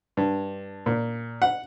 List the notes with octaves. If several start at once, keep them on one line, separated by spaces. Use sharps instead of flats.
G2
A#2
F#5